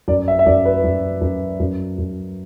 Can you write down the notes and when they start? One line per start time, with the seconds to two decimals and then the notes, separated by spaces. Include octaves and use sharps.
0.08 F#2 D5
0.28 E5
0.39 E5
0.46 F#2 D5
0.65 B4
0.84 F#2
1.21 F#2
1.60 F#2
1.98 F#2